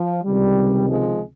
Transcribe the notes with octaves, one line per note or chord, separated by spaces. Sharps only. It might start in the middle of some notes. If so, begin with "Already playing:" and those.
Already playing: F3
C#2 C3 D#3 G3
F3 G#3